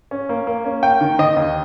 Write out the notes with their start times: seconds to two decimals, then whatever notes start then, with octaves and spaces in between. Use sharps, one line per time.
0.11 C#4
0.29 A#3
0.47 A#3
0.65 C#4
0.83 A#3 G5
1.01 D#3
1.19 D#3 D#5
1.36 D#2